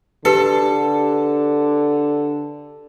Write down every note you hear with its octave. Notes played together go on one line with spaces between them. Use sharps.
D3 G4 A4 B4 C#7